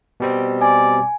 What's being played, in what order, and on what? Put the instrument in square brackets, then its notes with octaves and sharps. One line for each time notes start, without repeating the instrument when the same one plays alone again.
[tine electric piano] B2 G3 C4
[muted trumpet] D5 [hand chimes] G#5